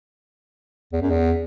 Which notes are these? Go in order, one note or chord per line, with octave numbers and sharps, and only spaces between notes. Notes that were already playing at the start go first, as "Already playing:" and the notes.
E2
F#2
E2